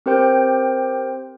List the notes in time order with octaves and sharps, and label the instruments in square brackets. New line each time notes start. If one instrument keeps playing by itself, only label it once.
[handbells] C4 G4 A#4 C5 G5 G6